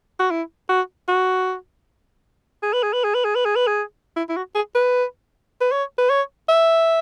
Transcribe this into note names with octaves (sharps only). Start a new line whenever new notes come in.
F#4
E4
F#4
F#4
G#4
B4
G#4
B4
G#4
B4
G#4
B4
G#4
B4
G#4
E4
E4
F#4
G#4
B4
B4
C#5
B4
C#5
E5